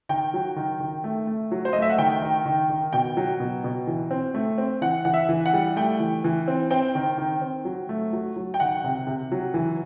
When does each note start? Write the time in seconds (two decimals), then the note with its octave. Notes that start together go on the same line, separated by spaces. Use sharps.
0.09 D#3 G5
0.34 F#3
0.56 D#3
0.80 D#3
1.04 A3
1.27 A3
1.51 F#3
1.65 C5
1.73 A3 D#5
1.82 E5
1.89 F#5
1.98 D#3 G5
2.22 D#3
2.46 D#3
2.70 D#3
2.93 B2 G5
3.17 F#3
3.40 B2
3.64 B2
3.87 E3
4.11 C4
4.35 A3
4.58 C4
4.81 E3 F#5
5.05 E3 F#5
5.14 E5
5.29 E3
5.46 F#5
5.54 G3
5.77 A3 G5
6.00 E3
6.24 E3
6.48 C4
6.70 C4 G5
6.95 D#3
7.18 D#3
7.41 C4
7.65 F#3
7.89 A3
8.13 F#3
8.36 F#3
8.54 G5
8.60 D#3 F#5
8.84 C3
9.07 C3
9.32 F#3
9.54 E3